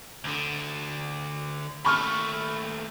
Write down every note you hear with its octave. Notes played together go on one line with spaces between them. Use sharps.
D2 D3
D#2 A3 B5 C#6 F6